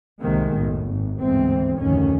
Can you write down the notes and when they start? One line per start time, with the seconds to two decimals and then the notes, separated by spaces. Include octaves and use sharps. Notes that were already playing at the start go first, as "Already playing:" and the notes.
0.20 C2 F2 C3 D#3 G#3 A#3
0.54 B1 F#2 A2
0.84 G#1
1.20 G1 D2 G#2 E3 C4
1.78 F1 D2 A2 D#3 C#4